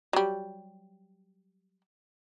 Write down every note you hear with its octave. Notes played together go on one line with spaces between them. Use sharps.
F#3 G3